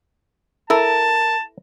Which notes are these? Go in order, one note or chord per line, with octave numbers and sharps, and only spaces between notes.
E4 A4 A#4 A5